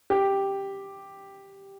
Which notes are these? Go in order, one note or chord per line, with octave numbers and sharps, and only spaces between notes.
G4